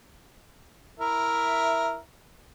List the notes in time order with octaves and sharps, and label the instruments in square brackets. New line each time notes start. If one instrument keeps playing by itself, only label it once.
[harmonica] E4 A#4 E5